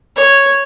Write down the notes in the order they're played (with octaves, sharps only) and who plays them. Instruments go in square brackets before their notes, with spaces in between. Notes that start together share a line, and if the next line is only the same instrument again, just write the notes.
[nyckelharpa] C#5